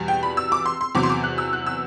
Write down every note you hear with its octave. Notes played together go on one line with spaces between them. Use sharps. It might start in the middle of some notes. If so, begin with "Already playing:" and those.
Already playing: E2 B2 G3
G5
B5
E6
D6
C6
C6
E2 C3 F#3 B3 D6
C6
D6
F#6
E6
F#6
E6